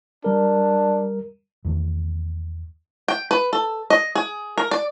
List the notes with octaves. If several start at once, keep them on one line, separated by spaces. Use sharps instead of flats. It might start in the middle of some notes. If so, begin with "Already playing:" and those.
G3 D4 A#4
E2 D#3 A3
G5
B4
A4
D#5
G#4
A#4
D5